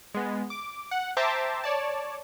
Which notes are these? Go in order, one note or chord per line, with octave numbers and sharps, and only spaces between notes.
G#3 B3
D6
F#5
C5 E5 G5 A5 A#5 D6
C#5 D5 A5